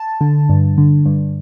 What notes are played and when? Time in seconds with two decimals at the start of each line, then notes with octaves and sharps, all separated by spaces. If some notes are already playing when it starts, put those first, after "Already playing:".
Already playing: A5
0.21 D3
0.49 G2
0.78 D3
1.06 G2